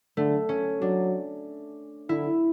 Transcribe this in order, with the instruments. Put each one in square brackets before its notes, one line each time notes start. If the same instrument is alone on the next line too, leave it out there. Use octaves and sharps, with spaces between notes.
[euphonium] D3 [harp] A3
[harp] C#4
[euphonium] F#3 [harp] D4
[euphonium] D3 [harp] E4